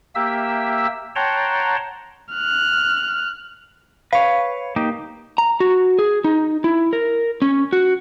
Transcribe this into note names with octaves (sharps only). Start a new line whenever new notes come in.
A#3 G4 E5 E6
C#5 F#5 G5 A5 A#5 C6
F6 F#6
B4 C#5 F5
A#3 D#4 G4
A#5
F#4
G#4
D#4
E4
A#4
C#4
F#4